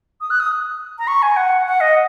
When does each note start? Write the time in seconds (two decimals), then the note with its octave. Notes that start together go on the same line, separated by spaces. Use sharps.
0.21 D#6
0.30 F#6
0.40 D#6
0.99 A#5
1.08 C#6
1.22 G#5
1.37 F#5
1.66 F#5
1.81 D#5